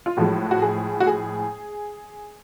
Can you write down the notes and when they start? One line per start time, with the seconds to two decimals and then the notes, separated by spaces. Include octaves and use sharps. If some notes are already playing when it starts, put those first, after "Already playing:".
0.06 F4
0.17 A2 F3 G#3 F#4
0.51 F#4
0.62 G#4
1.00 F#4
1.07 G#4